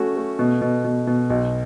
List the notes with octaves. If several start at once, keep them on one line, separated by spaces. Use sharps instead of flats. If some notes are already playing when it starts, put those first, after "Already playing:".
Already playing: A3 C#4 F#4
A3
B2
B2
B2
B2
B1